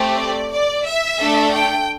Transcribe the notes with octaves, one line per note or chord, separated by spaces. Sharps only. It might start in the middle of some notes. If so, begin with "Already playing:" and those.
Already playing: A3 C4 G4
D5
D5
E5
A3 D4 A4
G5